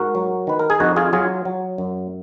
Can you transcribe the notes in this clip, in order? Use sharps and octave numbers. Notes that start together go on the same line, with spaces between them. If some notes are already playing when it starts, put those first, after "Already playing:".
Already playing: G#2 F#4 A#4
F#3
D#3 B4
A#4
G#4
F2 D#4 F#4
F4 G#4
F#3 F4 G#4
F#3
F#2